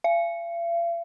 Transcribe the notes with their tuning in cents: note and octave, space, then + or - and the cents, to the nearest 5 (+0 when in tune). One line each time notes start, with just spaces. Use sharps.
F5 -45